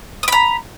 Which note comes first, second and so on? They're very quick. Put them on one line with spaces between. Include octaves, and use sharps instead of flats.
D#6 B5 A#5